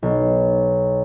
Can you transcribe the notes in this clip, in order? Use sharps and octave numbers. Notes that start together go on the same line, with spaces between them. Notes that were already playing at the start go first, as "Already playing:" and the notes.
B1